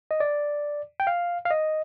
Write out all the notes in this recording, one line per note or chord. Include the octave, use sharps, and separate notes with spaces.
D#5
D5
G5
F5
F5
D#5